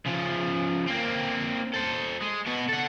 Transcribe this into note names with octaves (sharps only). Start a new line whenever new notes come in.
C#3 F3
A#3 C4
A4 C5
G#3
B2 F#4
A4 F#5